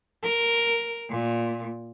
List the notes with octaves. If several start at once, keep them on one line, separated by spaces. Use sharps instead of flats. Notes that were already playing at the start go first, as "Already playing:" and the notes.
A#4
A#2